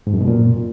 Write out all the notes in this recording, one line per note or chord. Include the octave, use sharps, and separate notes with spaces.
G#2
F#2
B2
A#2